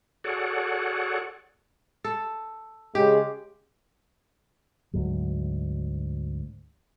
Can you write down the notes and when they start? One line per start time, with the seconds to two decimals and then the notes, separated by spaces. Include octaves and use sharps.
0.24 F#4 G#4 A4 C#5 D5 F#5
2.04 A4
2.95 C#3 G#3 G4
4.93 D2 G#2 F#3